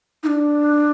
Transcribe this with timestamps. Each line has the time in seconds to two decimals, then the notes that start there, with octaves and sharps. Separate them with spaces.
0.23 D#4
0.27 D4